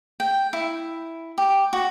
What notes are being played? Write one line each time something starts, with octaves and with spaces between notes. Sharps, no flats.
G5
E4
G4
F#4